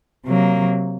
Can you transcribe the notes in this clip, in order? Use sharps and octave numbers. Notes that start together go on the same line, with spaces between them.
C3 F#3 A#3